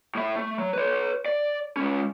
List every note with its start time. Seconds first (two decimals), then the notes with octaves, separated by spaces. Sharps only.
0.15 A2 E5
0.36 A3
0.59 F#3
0.73 B4 C#5
1.26 D5
1.77 G#3 C#4